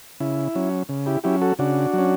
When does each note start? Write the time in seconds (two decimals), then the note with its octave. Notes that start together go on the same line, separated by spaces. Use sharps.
0.20 C#3 E4
0.55 F#3 C#4
0.89 C#3
1.06 E4 G4
1.24 F#3 C#4 E4 G4
1.42 F#4 A4
1.59 C#3 D4 F#4
1.94 F#3 C#4